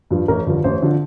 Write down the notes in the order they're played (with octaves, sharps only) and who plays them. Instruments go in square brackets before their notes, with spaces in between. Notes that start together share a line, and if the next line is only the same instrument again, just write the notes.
[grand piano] G2 F3
A1 A#4
G2 D3 F3
A1 C5
D3 F3